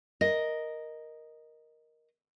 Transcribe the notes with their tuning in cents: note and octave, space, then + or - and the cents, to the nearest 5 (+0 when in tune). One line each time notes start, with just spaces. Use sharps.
A#4 +5 D#5 +0